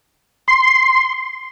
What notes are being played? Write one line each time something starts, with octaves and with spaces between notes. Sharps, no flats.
C6